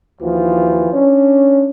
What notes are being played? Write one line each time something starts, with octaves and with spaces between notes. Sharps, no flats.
D#2 E3 F3 F#4
C#4 D4